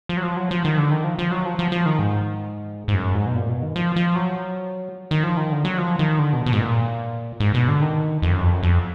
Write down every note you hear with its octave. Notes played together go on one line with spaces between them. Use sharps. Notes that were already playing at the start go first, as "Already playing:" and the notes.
F3
F#3
F3
F#3
F3
D#3
D3
D#3
F3
F3
F#3
F3
F3
F3
D#3
G#2
G#2
F#2
G#2
B2
A#2
B2
D#3
F3
F3
F#3
D#3
F3
D#3
D3
F#3
F3
D#3
D3
B2
B2
G#2
A#2
G#2
B2
D3
D#3
F2
F#2
F2
F#2
F2